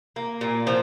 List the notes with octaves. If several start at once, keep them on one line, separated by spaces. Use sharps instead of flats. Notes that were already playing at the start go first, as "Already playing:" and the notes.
A#3
A#2
F3